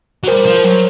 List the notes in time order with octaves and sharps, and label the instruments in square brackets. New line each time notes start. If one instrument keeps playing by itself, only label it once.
[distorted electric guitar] F#3
[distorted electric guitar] G3 [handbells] A#4 C5
[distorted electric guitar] F3
F#3